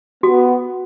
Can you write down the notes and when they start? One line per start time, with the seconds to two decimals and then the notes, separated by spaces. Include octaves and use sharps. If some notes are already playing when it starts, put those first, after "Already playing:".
0.23 B3 F#4